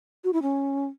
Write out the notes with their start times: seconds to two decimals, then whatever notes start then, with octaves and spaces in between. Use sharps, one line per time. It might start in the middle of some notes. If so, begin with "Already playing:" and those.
0.24 F#4
0.33 E4
0.42 C#4